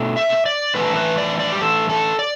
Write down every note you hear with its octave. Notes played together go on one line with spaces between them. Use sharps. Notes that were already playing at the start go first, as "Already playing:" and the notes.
Already playing: B2 A3 D4
E5
D5
A2 E3 A3 D4 B4
B4
D5
D5
G4
A4
A4
D5